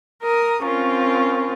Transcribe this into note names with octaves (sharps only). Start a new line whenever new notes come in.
A#4 A#5 D#6
C4 C#4 F4 A#4